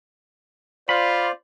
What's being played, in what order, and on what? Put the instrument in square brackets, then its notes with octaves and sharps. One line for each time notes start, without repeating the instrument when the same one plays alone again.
[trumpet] F4 [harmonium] C5 D5 [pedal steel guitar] B5